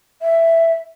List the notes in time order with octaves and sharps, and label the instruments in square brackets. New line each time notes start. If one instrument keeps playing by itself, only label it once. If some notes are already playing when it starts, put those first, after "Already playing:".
[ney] E5